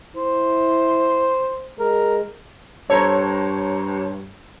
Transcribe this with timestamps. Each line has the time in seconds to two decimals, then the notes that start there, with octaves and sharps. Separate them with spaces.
0.17 E4 C5
1.79 G#3 A#4
2.90 G2 A4 C5 C#5 A#5